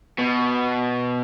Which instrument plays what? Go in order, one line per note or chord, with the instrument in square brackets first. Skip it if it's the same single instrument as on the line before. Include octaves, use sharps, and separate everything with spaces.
[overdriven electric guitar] B2